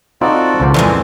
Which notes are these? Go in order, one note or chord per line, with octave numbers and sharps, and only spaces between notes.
C4 D#4 F4 F#4 A4 D5
C#2 F3 C5
F2 A#2 E3 G#3 A3 C4 D5